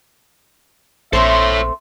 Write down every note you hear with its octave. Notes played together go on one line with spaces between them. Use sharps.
A#1 A3 C4 A4 C5 C#5 E5